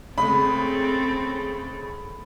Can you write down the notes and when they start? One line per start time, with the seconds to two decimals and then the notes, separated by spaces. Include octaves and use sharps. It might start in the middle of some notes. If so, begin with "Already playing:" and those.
0.18 C#3 G#3 A3 C4 A4 B5